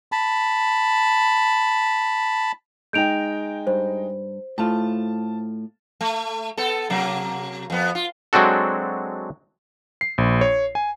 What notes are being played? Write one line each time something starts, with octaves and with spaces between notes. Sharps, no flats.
A5 B5
G#3 D#4 G5 G6 D7 F7
G2 C5
A2 A3 F4 A5
A3
B3 A4
C3 F#3 A#3
F2 B3
F4
F#3 G#3 C4 D4 F#4 A4
C7
A#1
C#5
G#5